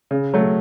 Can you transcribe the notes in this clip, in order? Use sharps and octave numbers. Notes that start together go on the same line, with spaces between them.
C#3
F#3 A3